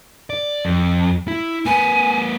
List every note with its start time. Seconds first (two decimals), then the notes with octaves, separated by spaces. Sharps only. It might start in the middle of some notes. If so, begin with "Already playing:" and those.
0.30 D5
0.65 F2
1.28 E4
1.66 A#3 B4 G#5